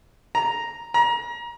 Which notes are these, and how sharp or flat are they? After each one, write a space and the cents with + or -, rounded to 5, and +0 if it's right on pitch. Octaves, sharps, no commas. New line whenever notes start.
A#5 +0
A#5 +30